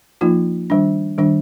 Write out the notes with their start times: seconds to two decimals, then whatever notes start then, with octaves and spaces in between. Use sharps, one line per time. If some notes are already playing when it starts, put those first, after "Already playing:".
0.21 F3 A#3 D#4 F4
0.70 D#3 G3 D4
1.18 D#3 G3 D4